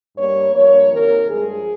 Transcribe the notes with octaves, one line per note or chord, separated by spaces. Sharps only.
G2 G3 A#3 C#5
G2 F3 A#3 C#5
C3 D#3 A#3 A#4
G2 F3 G#3 G#4